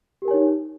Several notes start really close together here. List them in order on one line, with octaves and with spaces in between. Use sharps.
G4 A#4 G#5 C#5 D#4